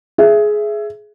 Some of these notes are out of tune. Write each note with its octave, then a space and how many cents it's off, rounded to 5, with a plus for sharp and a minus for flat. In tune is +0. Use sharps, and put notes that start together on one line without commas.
G#4 +15 E5 +15